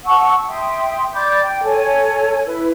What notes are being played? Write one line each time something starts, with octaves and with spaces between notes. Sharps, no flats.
F#5 A5 C#6 E6
E5 G5 C6 D#6
D5 B5 D6 G6
G5
A4 C#5 G#5
E4 B4